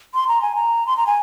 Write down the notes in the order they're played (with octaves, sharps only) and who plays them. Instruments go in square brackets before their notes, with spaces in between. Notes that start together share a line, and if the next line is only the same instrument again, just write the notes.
[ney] C6
A#5
G#5
A#5
C6
A#5
G#5